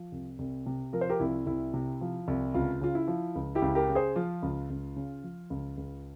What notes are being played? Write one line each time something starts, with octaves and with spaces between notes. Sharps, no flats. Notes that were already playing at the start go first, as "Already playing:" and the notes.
Already playing: F3
C2
C2
C3
F3 A#4
C5
G4 A#4
C2 E4
C2 E4
C3
F3
C2
C#2 F4
C#3 F4
E4
F3
C#2
E4 G4
C#2
G4 A#4
C#3
G#4 C5
F3 F4
C#2
C#2
C#3
F3
C#2
C#2